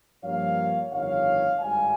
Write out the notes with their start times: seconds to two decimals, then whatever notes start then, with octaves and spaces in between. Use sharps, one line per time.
0.23 G2 F3 A#3 C#5 F5
0.90 G1 F2 D#3 C#5 F5
1.58 G#1 G2 G3 F5 G#5